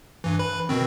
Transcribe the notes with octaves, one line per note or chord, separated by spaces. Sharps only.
G2 E3
B4 B5
B2 D#3 C4